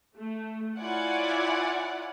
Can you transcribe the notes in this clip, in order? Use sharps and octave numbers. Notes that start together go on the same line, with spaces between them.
A3
E4 F4 C#5 D5 F#5 G#5